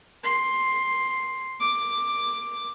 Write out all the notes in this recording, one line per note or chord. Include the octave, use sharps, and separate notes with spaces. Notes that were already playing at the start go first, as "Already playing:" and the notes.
C6
D6